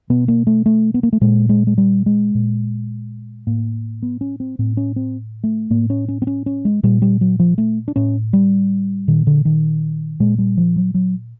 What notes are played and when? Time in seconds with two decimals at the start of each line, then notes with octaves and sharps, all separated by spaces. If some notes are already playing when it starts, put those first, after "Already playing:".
0.10 B2 B3
0.28 A#3
0.47 A3
0.66 A3
0.94 B3
1.03 A#3
1.13 A3
1.21 A#2 G#3
1.49 G#3
1.67 G#3
1.78 G3
2.06 G#3
2.35 A#2
3.47 A2 A#3
4.03 B3
4.21 C#4
4.40 C4
4.59 A2 C4
4.77 C#4
4.96 C4
5.44 A3
5.70 A2 A#3
5.90 C#4
6.08 C#4
6.22 C4
6.27 C#4
6.46 C#4
6.65 G#3
6.83 A#2 G3
7.02 G3
7.21 F#3
7.39 F3
7.58 A3
7.88 D4
7.96 A2 C#4
8.33 G3
9.08 A#2 D#3
9.27 D3
9.45 D#3
10.20 A#2 G#3
10.38 G3
10.57 F3
10.76 F#3
10.94 F#3